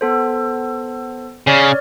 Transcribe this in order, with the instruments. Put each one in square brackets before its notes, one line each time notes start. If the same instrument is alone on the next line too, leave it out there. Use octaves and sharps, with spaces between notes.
[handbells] B3 A4 C5
[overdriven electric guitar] C#3 [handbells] C#5 D5 F6